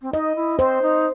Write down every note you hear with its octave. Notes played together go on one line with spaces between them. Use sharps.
C4
D#4 D#5
E4
C4 C5
D#4